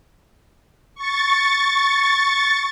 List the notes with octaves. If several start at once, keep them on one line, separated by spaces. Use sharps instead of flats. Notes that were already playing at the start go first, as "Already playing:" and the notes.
C#6 A6